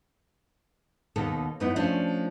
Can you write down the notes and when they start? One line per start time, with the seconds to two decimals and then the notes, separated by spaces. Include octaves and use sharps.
1.16 D#2 B2 D#3 A4
1.60 F#2 B3 D#4 E4
1.76 F3 A3 C#4 D4